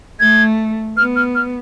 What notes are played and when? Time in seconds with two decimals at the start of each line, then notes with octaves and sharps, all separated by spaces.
0.20 A3 G#6
0.97 B3 F6
1.16 F6
1.35 F6